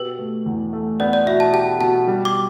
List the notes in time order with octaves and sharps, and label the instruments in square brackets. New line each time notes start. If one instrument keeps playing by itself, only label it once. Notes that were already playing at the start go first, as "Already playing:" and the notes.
Already playing: [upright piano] B2 G4 [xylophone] B4
[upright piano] A3
E2
A3
[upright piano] B3 [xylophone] D5
[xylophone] D5
[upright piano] B2 [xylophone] E5
[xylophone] A5
[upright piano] G4 [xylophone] A5
[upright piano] B2 [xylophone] A5
[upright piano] G3
[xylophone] D6